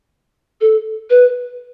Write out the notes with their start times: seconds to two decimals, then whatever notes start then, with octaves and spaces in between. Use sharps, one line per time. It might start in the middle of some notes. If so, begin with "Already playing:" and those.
0.61 A4
1.10 B4